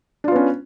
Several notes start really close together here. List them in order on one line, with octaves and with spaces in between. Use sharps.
D4 F4 B3 C#4